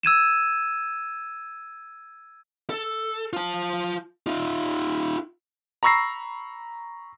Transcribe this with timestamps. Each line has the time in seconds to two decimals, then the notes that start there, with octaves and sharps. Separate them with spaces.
0.03 E6 G#6 D#7 E7
2.70 A4
3.33 F4 A5
4.27 D#4 F4
5.83 A#5 B5 C#6 E6 A#6 C7